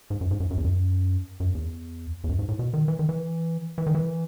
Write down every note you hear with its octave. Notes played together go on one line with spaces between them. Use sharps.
G#2
F#2
G#2
F#2
F#2
E2
F#2
F#2
E2
E2
F#2
G#2
A2
B2
D#3
E3
D#3
E3
E3
D#3
E3